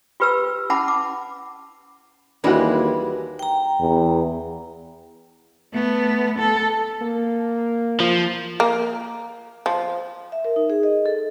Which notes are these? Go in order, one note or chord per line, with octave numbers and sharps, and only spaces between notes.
F4 G4 B4 A#5 E6
C#4 E4 F#5 A5 B5 D6
D6
D#2 E3 G3 G#3 D4 E4 F#4
G5 A#5
E2
A3 B3
A4
A#3
F3
A#3
F3
E5
A#4
D#4
G#4
D#5
A4